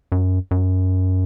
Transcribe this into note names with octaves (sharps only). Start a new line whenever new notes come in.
F#2
F#2